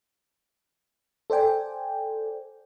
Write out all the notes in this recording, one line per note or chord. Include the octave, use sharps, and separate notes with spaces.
A4 C5 D5 G5 G#5